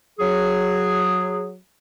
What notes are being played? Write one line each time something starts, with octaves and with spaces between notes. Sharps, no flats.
F#3 G#4